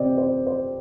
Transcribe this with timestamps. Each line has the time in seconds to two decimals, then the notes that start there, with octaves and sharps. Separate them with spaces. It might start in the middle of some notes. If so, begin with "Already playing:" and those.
Already playing: C3 C4 C5 D5 D#5
0.18 C5
0.47 C5